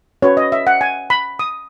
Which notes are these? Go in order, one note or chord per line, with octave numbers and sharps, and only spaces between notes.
C#4 F#4 B4 C#5
D#5
E5
F#5
G#5
B5
D#6